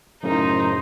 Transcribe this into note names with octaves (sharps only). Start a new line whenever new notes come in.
F#2 A2 C#3 D#4 C5